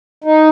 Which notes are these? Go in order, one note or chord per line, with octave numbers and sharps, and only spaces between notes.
D#4